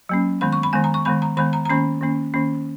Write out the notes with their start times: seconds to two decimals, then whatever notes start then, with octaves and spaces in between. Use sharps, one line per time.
0.09 F#3 A#3 C#4
0.41 D#3 G#3 B3 B5
0.53 C#6
0.63 B5
0.73 D#3 G#3 B3 G#5
0.84 A#5
0.94 C#6
1.05 D#3 G#3 B3 B5
1.22 A#5
1.37 D#3 G#3 B3 B5
1.53 A#5
1.65 A#5
1.69 D#3 A#3 C#4 B5
2.01 D#3 A#3 C#4
2.34 D#3 A#3 C#4